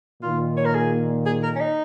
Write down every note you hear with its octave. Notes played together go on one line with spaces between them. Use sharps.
A#2 D#3 F4
C#5
A#4
G#4
G#4
A#4
C#4
D#4